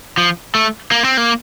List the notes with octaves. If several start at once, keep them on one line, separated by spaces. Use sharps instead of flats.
F3
A3
A#3
C4
A#3